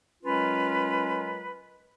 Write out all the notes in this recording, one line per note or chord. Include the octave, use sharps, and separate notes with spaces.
F#3 G#3 C#4 F4 A#4 B4